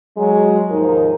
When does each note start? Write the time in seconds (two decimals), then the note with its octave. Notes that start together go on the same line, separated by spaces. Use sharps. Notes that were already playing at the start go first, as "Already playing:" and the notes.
0.17 F#3 G#3
0.70 D#2 G#2 D#3 F3 D#4 A#4